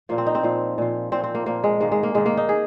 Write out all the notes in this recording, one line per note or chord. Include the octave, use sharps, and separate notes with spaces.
A#2 F3 A#3
C4
D#4
C4
A#2 F3
A#2 F3
A#2 F3 C4
C4
A#3
A#2 F3 A#3
G#3
G#2 D#3 A#3
G#3
A#3
G#2 D#3 G#3
A#3
D#4
D#3 G#4